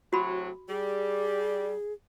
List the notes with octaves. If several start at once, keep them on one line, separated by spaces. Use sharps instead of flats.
A2 C3 F#3 F#4 B5
G3 G#4